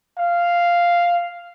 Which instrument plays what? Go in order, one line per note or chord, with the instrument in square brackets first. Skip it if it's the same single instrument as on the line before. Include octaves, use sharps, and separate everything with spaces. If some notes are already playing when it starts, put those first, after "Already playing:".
[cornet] F5